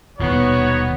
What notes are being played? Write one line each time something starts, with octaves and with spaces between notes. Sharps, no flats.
D#1 B2 B3 D#4 F#4 C#5